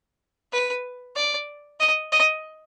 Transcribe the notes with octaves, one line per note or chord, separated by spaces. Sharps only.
B4
D5
D#5
D#5